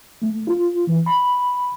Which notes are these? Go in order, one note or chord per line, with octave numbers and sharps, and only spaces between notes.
A3
F4
E3
B5